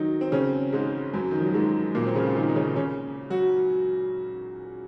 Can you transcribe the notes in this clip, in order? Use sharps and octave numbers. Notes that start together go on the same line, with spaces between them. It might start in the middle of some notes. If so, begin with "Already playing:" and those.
Already playing: D#3 F#3 D#4 F#4
C4
C#3 C#4
G#2 G#3
F#2 F#3
D#3
F3
F#3
G#2 G#3
A#2 A#3
C4
C#3 C#4
F4
D#3 D#4
D#4
C#3 C#4
C#3 C#4
F#3 F#4